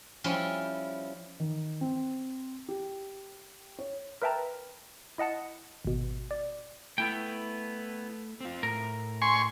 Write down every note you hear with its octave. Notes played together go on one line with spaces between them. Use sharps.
F3 G3 C#4 E4
D#3
C4
G4
C#5
A#4 B4 E5 G5 A5 A#5
E4 D#5 F#5 A5 C#7
G#1 B2
D5
A3 B3 E4 G5
C4 F4
A2 A#4
G#5 C6 C#6